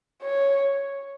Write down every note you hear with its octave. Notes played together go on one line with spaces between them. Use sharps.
C#5